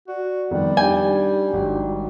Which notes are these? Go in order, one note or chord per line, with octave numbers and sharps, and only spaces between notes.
F#4 D5
F2 D#3 G3 B3
D4 D#4 G4 G5 G#5 G6
G#1 F#3